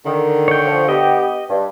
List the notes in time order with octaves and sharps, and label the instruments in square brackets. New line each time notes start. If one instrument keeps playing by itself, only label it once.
[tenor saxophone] D3 [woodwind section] D#3
[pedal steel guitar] C#5 G5
[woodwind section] F3
[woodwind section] B3 G4 [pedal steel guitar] D#5
[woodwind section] G2